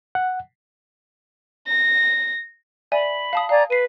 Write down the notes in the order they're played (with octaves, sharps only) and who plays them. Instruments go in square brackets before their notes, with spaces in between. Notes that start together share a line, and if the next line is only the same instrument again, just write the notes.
[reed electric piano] F#5
[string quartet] A#6
[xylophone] D5 E5 G#5 [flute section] B5
[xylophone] F5 A5 D#6
[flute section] D5 G#5 A#5 [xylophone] F5
[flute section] B4 [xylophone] C7 D#7